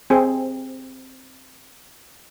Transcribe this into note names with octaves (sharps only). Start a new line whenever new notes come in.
C4 G#4